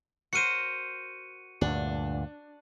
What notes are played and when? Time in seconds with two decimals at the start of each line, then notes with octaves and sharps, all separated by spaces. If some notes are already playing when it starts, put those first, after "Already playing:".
0.33 F#4 A#4 C5 C#7 D#7
1.61 D2 G2 A#2 D4